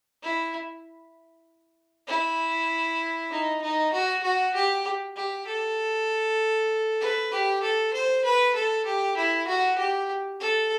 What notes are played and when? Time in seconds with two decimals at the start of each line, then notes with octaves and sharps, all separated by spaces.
0.23 E4
2.08 E4
3.31 D#4
3.62 D#4
3.93 F#4
4.23 F#4
4.54 G4
5.16 G4
5.47 A4
7.01 B4
7.31 G4
7.62 A4
7.93 C5
8.24 B4
8.55 A4
8.86 G4
9.17 E4
9.48 F#4
9.78 G4
10.40 A4